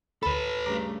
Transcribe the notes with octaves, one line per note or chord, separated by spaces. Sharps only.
D2 A4 B4 B5 E7
G2 C#3 A3 A#5 D6